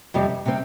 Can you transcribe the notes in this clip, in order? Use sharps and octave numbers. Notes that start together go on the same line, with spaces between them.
F2 C3 G3 C4
C3 G3 C4